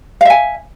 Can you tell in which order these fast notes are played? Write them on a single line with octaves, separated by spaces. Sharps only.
F5 E5 G#5